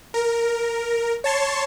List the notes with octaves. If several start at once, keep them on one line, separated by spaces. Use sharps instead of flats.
A#4
C#5 A5 C6 C#6